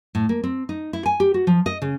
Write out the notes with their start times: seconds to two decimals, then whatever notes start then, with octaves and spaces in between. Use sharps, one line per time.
0.15 A2
0.29 A#3
0.44 C4
0.69 D#4
0.93 E4
1.06 G#5
1.20 G4
1.34 F#4
1.47 F3
1.66 D#5
1.82 C#3